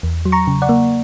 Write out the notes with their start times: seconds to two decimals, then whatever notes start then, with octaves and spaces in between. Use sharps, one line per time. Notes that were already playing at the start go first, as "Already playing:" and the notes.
0.03 E2
0.25 F#3
0.32 A#5 C#6
0.47 C#3
0.62 D5 F#5
0.69 A#3